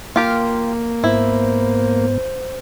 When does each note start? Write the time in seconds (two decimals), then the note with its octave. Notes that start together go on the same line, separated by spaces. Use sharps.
0.16 A#3 F4 G4 A#4
1.04 G#2 B3 E4 C5